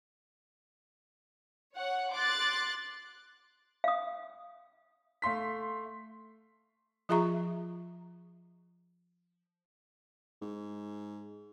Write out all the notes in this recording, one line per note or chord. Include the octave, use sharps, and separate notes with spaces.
C#5 F#5
C6 D6 F#6 A6
F5 D#6
A3 F5 C6 B6
F3 F4 G#4 E5 A#5 C#6
G#2